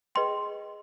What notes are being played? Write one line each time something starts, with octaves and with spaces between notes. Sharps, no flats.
G#4 B4 D#5 G5 C6